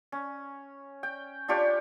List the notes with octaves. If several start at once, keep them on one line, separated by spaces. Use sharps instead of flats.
C#4
G5
D4 F4 G4 C#5